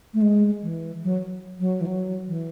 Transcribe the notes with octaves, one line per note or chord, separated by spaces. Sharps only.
A3
G#3
E3
F#3
F#3
E3
F#3
E3